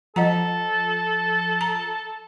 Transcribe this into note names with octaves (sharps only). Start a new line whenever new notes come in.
F3 A4 D#5 F#5 A#5
A#5